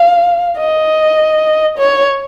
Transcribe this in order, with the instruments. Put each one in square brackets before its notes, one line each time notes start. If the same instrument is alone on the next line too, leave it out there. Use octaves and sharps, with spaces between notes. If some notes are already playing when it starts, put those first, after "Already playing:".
Already playing: [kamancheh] F5
D#5
C#5